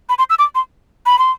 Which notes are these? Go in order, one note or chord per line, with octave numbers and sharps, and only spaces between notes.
B5
C6
E6
D6
C6
B5
C6